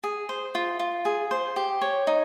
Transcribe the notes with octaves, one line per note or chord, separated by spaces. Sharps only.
G#4
C5
F4
F4
G#4
C5
G4
C#5
D#4